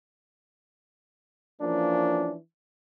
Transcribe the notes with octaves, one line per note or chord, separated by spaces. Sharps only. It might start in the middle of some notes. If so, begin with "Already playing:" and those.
E3 F3 A#3 C#4 D4